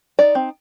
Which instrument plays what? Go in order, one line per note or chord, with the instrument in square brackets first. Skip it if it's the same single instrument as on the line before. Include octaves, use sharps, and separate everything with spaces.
[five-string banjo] D#4 D5
C4